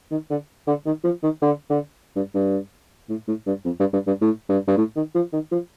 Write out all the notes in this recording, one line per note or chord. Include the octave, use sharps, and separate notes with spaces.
D#3
D3
D3
D#3
F3
D#3
D3
D3
G2
G2
A2
A2
G2
F2
G2
G2
G2
A2
G2
G2
A2
D#3
F3
D#3
F3